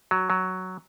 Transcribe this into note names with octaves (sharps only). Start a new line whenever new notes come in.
F#3
F#3